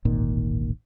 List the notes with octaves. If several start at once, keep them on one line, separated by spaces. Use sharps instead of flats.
D1 G#1 A#2 D#3